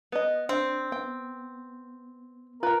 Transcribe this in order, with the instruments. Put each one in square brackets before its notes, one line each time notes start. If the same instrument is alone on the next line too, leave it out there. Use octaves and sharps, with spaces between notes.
[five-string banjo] B3 D#5
[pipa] C4 [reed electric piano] D4 [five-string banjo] G5
[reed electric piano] B3 [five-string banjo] G5
[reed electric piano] F4 [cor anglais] A#4 [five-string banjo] B4 G5